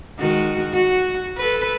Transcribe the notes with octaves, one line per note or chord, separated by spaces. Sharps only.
D#3 G#3 F#4
F#4
A4 B4